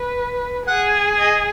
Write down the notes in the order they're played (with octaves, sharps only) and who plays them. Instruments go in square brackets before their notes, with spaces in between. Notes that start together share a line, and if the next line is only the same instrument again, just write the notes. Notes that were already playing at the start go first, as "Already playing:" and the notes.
Already playing: [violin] B4
[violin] G#4 [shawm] F#5
[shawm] D#5